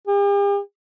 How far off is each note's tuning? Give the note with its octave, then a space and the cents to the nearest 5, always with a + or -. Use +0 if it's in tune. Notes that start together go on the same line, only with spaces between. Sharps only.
G4 +45